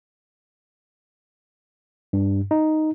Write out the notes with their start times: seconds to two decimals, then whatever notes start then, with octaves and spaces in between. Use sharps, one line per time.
2.13 G2
2.51 D#4